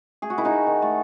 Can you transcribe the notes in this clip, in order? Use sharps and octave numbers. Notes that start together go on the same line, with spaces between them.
A3 G#4
F#4
D#3 E4
D#4 F#4
A3
D#3
A3